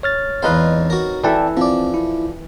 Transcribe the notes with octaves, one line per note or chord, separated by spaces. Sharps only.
C#5 F6 A6
E2 G#3 C4 D#4 B4 F5
F#4 A#4
E3 A4 D5 E5 G5 A5
F3 C4 D5
E4